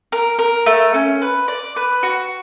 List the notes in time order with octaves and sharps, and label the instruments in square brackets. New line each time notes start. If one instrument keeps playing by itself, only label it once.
[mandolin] A#4
A#4
A3
C#4
B4
D5
B4
F#4